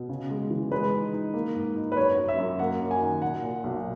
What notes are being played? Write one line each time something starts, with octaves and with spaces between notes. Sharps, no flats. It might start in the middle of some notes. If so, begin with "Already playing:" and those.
Already playing: B2
C#3
G#3
E3
G#3 B4
D#4
D#4
A#3
G#2
D#4
B4
F#2 C#5
F#2
E5
F#2
A#3 F#5
F#2
G#5
D#3
A#2 F#5
A#2
B1